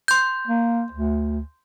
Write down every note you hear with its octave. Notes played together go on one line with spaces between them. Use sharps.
C6 G6
A#3
D2